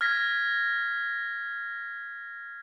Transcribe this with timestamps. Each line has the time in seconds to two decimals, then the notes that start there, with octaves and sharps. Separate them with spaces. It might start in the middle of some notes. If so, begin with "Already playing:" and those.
0.01 F6 G#6 A#6 B6